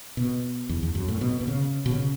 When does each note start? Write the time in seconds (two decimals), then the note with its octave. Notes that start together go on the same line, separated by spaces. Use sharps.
0.17 B2
0.69 E2
0.83 E2
0.95 F#2
1.08 A2
1.21 B2
1.41 B2
1.48 C#3
1.86 B2
1.91 C#3